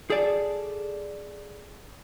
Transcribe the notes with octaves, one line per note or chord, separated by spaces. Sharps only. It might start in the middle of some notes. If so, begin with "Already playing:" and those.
G#4 A4 D5